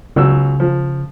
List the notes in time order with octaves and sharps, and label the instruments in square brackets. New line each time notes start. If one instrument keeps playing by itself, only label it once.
[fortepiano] C#2 F#3 E6 [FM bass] C#3
[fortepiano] F3